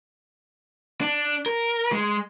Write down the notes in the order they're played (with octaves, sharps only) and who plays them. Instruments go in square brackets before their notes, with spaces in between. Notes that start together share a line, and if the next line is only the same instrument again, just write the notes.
[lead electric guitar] D4
A#4
G#3